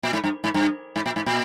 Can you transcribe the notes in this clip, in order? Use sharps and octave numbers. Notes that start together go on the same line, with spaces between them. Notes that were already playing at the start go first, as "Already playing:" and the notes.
A#2
G#2
G2
G#2
G2
G#2
A#2
G#2
A#2